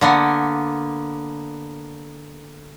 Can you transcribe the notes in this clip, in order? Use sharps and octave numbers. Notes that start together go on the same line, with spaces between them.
D3 A#3 B3